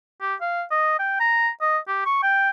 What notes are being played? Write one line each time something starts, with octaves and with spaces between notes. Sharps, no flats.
G4
F5
D#5
G5
A#5
D#5
G4
C#6
G5